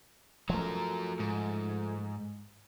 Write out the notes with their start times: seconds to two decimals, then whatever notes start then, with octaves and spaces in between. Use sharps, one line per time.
0.50 F3 F#3 A3 A#4
1.19 G#2